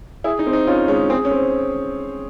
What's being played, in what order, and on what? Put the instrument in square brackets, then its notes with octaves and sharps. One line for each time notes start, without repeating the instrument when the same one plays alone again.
[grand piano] E4 [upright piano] G#4
[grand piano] D#4
[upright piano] C4
[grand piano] D#4
[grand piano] C#4 [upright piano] F4
[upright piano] G#3 [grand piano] C#4
[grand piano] C4 [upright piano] G#4
[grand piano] C#4
[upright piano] C4